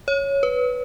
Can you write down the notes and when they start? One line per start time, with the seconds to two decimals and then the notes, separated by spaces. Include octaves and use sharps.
0.08 C#5
0.43 B4